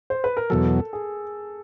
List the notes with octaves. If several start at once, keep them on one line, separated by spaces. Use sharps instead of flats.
C5
B4
A#4
E2 B2 F#3 A4
G#4